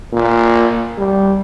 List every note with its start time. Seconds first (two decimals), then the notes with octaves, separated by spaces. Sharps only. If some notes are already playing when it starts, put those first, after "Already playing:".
0.13 A#2
0.98 G3